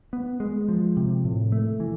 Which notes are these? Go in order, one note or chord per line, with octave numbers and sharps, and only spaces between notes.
B3
G#3
F3
C3
A2
A3
E3